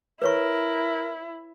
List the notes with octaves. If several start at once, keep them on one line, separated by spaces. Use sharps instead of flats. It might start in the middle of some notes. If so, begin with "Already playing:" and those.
E4 A#4 B4 C#5 C#6